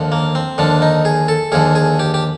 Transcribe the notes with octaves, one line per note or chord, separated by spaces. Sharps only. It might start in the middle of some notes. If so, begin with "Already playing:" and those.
Already playing: D#2 D3 F3
A#3
C4
D#2 D3 F3 D4
D#4
G#4
A4
D#2 D3 F3 G#4
G#4
G4
G4